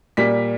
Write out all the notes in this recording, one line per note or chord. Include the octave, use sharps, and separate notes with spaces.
A#2 G3 B6